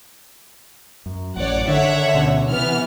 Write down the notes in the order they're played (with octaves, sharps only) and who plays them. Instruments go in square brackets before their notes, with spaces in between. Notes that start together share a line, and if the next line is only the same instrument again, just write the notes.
[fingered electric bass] F#2
[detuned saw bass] A1 [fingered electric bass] F#2 [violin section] C#5 D5 F#5
[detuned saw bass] D3 [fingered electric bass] D#3 [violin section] C#5 E5 F#5
[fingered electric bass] D2 B2 C#4
[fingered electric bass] C3 [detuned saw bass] E3 [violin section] B3 F6